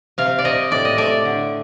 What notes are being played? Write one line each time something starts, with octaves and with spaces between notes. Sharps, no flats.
C3 F5
D5
C3 D#5
A2 D5
D#5
A3 D5
D3